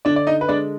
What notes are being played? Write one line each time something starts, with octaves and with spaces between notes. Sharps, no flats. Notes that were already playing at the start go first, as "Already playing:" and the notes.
D3 D4 D5
D5
D#4 D#5
B4
G#3 D4 D5